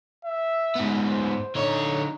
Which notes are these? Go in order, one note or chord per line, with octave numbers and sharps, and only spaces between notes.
E5
G#2 B3
C5
D3 D#4 C#5